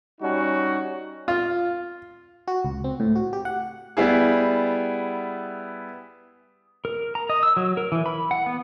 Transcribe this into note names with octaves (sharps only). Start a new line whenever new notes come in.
G3 C#4 D#4 F#4
F4
F#4
C#2
C4
A2
F#4
G4
F#5
G3 B3 E4 G#4
A#4
A#5
D#5
E6
F#3
A#4
E3
B5
F#5
B3